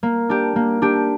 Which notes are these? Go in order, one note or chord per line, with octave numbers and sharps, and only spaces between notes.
A#3
D4 G4
A#3
D4 G4